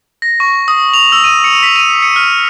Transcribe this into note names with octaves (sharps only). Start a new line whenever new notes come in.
A#6
C#6
D#6
F7
E6
D#7
C#7
B6
D#7
C#7
F6